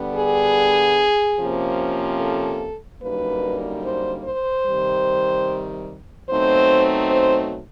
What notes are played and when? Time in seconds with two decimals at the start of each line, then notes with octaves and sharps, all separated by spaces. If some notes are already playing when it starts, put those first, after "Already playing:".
Already playing: D3 G3 B3 D4
0.16 G#4
1.38 C3 F3 A#3 C#4
2.20 A4
3.02 F#2 D3 G3 A#3 D#4 B4
3.84 C5
4.25 C5
4.66 C3 D#3 G3
6.29 B2 F#3 A3 C4 D#4 C5
7.11 C5